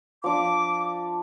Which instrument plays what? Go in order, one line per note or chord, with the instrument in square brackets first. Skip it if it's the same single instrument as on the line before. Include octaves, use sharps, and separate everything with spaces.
[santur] F3 D4 [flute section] D6